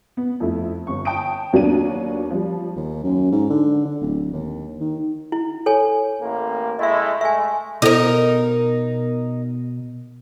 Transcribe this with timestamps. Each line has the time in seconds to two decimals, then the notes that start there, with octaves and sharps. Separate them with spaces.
0.17 B3
0.40 F2 A3 E4
0.87 G1 C#6
1.05 G5 A5 D#6 D7
1.53 D#2 F#3 A#3 B3 D4 D#7
2.31 F3 G3
2.76 D#2
3.04 F#2
3.31 G#2
3.49 D3
3.85 D3
4.01 D1
4.32 D#2
4.80 D#3
5.32 E4
5.66 A4 C#5 G#5
6.21 A1 A#3
6.79 G#3 A3 E4 D#5 E5
7.21 G#3 A3 E5 G#5
7.82 B2 D#4 E4 A4 A#4 C5